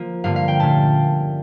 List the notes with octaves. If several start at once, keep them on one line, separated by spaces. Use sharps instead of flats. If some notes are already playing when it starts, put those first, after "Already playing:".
Already playing: F3 A#3
G2 D3 F3 A#3 F5
F5
G5
A#2 A3 C#4 A5